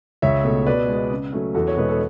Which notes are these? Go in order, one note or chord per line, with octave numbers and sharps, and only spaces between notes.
C#2 C#5 E5
B2 A3
B2 B4 D5
G#3 B3
C#3
F#3 A3 C#4
E2 F#4 A4
C#5
B2 G#3 B3 B4
A4